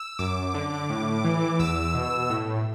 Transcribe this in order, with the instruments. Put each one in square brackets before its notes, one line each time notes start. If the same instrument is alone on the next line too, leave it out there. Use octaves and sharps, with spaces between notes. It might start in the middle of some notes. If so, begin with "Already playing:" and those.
Already playing: [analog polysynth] E6
F#2 D6
D3
A2
E3
E2 E6
B2
A2